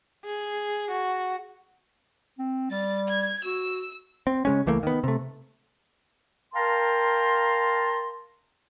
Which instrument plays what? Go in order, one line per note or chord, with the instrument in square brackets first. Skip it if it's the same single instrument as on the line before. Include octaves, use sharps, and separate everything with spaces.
[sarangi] G#4
F#4
[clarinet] C4
[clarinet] G3 [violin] A6
[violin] G#6
[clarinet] F#4 [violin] E6
[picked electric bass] C4
C#3 G#3 C#4
C#2 E3 A3 A#3
D#3 B3
C3 A3
[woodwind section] A#4 F5 G5 A5 A#5 C6